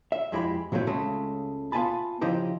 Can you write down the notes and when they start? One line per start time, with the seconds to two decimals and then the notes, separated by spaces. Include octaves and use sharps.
0.12 E5
0.32 F2 G#3 E4 G4 C5 B5
0.72 A#2 F#3 G#3 A3 C4 E4
0.87 C#2 C#3 G#3 A3
1.72 B3 F4 E5 G#5 A5 B5
2.21 C#3 F3 D#4 E4 G4